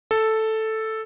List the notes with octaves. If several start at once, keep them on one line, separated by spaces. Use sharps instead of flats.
A4